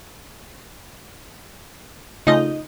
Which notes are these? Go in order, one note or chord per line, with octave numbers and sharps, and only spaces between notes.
C#3 A3 D#4 F4 D#5